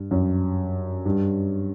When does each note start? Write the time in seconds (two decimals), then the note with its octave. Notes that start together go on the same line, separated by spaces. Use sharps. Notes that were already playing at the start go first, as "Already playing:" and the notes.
Already playing: G2
0.11 F#2
1.05 G2